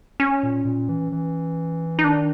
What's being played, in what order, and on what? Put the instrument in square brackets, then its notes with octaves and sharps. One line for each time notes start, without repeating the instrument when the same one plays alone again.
[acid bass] C#4
[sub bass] A#2
A#2
E3
E3
[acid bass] D#4
[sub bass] D#3 [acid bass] D4